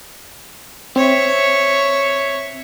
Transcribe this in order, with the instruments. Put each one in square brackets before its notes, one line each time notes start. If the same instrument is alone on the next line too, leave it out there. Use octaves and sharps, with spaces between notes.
[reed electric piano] C4 [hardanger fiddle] C#5 E5